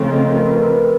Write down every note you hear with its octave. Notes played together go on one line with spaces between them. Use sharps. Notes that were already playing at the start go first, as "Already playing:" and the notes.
Already playing: C#3 F3 A3 C4 F4
D#5
A#4
B4
A#4
B4
A#4